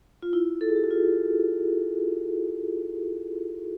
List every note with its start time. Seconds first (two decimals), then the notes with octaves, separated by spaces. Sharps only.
0.22 F4
0.33 E4
0.61 A4
0.69 G#4
0.76 G4
0.84 F#4
0.91 F4